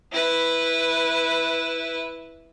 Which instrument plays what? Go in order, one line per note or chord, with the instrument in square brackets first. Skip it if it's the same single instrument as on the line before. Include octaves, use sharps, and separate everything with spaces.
[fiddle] E4 B4